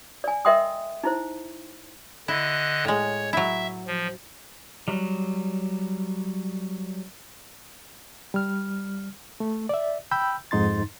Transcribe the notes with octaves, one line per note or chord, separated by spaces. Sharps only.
D5 G#5
A#4 D#5 E5 G5 C6 D#6
D#4 E4 C5
D3 E4 D#5 F#6
A2 G#3 C#5
F#3 E4 E5
F3
F#3 G3
G3 F6
A3
D5 E5
G5 B5 E6 G6
F2 G#2 D#4 C6 A6